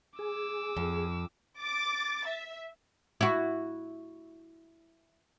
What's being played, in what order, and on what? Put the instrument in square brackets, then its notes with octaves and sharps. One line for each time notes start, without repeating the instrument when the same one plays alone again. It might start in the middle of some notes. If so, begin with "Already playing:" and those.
[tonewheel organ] G#4 [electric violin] D6 E6
[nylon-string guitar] F2
[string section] D6 A6
E5
[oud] E4 F#4